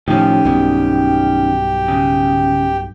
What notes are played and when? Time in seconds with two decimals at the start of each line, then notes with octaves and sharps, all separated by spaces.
0.08 A2 D#3 F3 C#4 G4 G5
0.45 B1 G2 B2
1.88 C#3